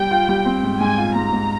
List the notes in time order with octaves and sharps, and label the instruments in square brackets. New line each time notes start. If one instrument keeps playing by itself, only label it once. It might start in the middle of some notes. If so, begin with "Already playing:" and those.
Already playing: [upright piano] G3 [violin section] G5
[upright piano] F4
G3
C4
G#2
[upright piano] G#2 [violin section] G#5
[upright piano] F4
[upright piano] G#2 [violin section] A#5
[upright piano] G#2